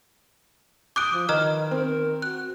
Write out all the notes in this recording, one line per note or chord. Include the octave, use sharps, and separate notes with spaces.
D6 D#6 F#6 G6 D7 G7
F3
D#3 B4 D#5 A#5 F6
C4 A#4
F#4 F#6